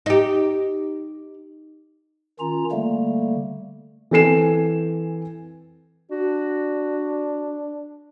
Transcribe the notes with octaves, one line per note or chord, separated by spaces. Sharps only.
D#4 G4
D#3 C#4 F4 A#5
D3 G3 A3 A#3
E3 C4 A4 G#5 C7 E7
D4 F#4